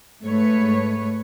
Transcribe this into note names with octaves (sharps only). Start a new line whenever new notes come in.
G#2 A3 B4 C#5